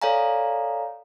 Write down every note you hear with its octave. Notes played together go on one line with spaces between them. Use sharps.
A4 C#5 D5 F5 G#5 A#5